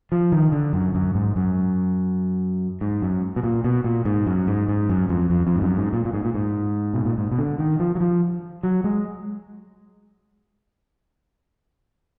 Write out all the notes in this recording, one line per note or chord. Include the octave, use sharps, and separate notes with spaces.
F3
D#3
D3
F#2
F#2
G#2
F#2
G#2
F#2
B2
A#2
B2
A#2
G#2
F#2
G#2
G#2
F#2
F2
F2
F2
G#2
F#2
G#2
A#2
A#2
G#2
A#2
G#2
B2
A#2
G#2
B2
D3
D#3
F3
F#3
F3
F#3
G#3